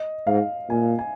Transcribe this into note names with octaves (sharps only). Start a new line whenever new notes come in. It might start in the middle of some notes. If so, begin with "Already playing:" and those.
Already playing: D#5
G#2 F5
A#2 G#5
G#5